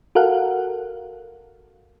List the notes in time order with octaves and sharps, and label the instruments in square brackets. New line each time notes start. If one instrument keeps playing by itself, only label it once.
[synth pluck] F#4 A4 A#4 F5 F#5